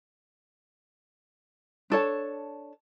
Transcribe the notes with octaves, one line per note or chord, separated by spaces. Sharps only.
D4 A4 C#5 A5